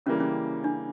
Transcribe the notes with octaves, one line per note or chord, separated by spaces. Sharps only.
C#3 E3 G3 A#3 C#4
C#4
D4